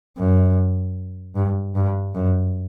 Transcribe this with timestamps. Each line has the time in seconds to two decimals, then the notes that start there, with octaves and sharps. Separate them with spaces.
0.18 F#2
1.35 G2
1.75 G2
2.14 F#2